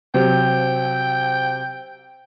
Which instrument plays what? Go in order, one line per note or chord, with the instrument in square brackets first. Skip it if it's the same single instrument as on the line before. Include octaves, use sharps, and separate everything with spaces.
[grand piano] C3 F#3 C4 [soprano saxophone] G5